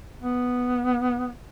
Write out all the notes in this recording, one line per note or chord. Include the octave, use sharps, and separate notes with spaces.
B3